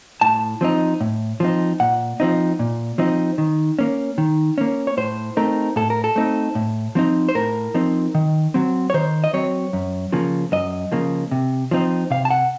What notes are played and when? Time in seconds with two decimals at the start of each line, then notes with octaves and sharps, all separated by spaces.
0.21 A2 A5
0.61 F3 C4 D#4
1.01 A2
1.40 F3 C4 D#4
1.80 A#2 F#5
2.20 F3 C4 D#4
2.59 A#2
2.98 F3 C4 D#4
3.38 D#3
3.79 A#3 C#4
4.18 D#3
4.58 A#3 C#4
4.87 C#5
4.97 A2 C5
5.37 A3 C4 D#4 A#4
5.76 A2 A4
5.90 A#4
6.04 A4
6.16 A3 C4 D#4
6.55 A2
6.95 F3 C4 D#4
7.29 C5
7.35 A2 A#4
7.74 F3 C4 D#4
8.15 D#3
8.54 F#3 C4
8.90 C#5
8.94 D#3 C5
9.24 D#5
9.33 F#3 C4 C#5
9.73 F#2
10.13 C#3 F3 A#3
10.52 F#2 D#5
10.92 C#3 F3 A#3
11.31 C3
11.71 F3 C4 D#4
12.11 C3 F5
12.25 A5
12.30 F#5